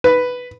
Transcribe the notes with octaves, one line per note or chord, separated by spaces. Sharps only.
B4